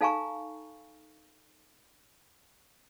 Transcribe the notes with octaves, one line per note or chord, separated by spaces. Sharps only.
D#4 A4 F5 G#5 A#5 C#6